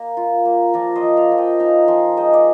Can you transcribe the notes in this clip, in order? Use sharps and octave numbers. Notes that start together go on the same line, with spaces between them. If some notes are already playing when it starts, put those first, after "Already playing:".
Already playing: A#3 A#4
F4
A#3
F3 A#4 D5
C5 D#5
F3
D5 F5
F3
D#5 G5
D#4 F5 G#5
F3 G#5 C6
G#3 C5 D#5
D5